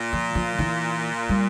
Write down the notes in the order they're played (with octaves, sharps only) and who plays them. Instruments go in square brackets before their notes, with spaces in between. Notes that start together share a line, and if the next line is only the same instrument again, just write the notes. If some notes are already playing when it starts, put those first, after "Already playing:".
Already playing: [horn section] A#2
[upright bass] F3
F3
E3
G3